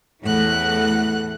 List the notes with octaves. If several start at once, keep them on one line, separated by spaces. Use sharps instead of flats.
E2 A2 E3 A3 F#5 F#6